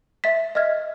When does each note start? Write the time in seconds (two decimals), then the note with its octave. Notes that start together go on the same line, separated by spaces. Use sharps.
0.24 E5 A6 B6
0.55 D#5 E5 F6 G#6